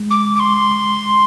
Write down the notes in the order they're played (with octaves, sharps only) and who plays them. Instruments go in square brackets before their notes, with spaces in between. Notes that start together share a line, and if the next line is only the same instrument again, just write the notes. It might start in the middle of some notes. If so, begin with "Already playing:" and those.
Already playing: [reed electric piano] G#3
[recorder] D6
D6
C6